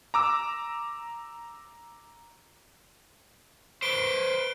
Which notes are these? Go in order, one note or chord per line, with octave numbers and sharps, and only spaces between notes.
A#5 D6 E6
B4 C5 D7 G7